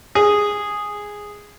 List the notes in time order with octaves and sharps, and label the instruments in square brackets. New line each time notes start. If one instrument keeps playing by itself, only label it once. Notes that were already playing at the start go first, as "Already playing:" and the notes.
[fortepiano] G#4